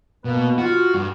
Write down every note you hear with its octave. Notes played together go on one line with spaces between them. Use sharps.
B2 A#3 B4
F4 F#4
G2